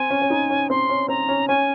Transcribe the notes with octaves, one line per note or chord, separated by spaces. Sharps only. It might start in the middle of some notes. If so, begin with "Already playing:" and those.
Already playing: C4 G#5
C#4
C#4
D#4
C#4
C4 C6
C#4
C4 A#5
C#4
C#4 G#5